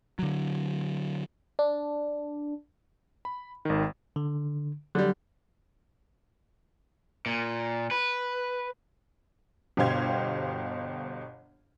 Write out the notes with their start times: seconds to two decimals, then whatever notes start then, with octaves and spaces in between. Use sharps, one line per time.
0.19 D3 F#3
1.59 D4
3.25 B5
3.65 G#1 D#3
4.16 D3
4.95 D3 F#3 G3
7.26 A#2
7.91 B4
9.77 G1 B2 G4 C5 F5 G#6